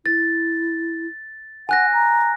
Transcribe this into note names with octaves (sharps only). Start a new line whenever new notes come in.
E4 A6
F#5 G#5 F#6 A#6
A#5